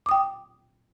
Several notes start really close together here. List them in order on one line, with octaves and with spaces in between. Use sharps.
D6 D#6 G5